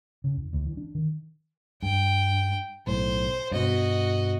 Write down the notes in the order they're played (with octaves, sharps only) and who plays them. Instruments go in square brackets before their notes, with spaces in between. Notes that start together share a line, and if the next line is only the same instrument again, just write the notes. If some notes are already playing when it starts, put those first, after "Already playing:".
[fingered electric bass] C#3
E2
D2
E3
D4
D#3
[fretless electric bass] G2 [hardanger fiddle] G5
[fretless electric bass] B1 A2 [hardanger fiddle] C5
[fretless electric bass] G2 B2 [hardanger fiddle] F#4 D#5